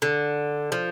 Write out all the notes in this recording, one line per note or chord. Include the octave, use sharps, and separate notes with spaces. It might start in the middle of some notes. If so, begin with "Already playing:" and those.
D3
F3